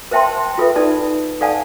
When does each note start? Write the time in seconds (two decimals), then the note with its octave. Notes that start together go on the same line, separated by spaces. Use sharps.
0.11 A#4 C5 E5 G5 A5 C6
0.58 F4 A4 B4 E5
0.76 D#4 A4 D5 A5
1.41 A4 D5 F5 F#5 G#5 A5